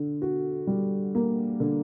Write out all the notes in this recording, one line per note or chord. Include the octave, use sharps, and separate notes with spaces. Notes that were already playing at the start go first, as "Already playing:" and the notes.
Already playing: D3
F#4
G3
A#3
D3